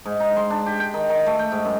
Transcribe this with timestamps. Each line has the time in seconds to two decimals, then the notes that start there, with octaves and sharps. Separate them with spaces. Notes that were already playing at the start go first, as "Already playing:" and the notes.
0.06 G#2
0.20 D#4
0.37 C6
0.50 D4
0.66 G4
0.80 G5
0.94 D#3
1.09 D#3
1.26 A3
1.39 G5
1.52 G#2
1.65 F#2